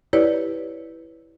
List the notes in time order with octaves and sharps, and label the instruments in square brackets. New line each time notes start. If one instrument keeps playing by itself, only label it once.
[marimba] E4 G4 B4 C#5 D5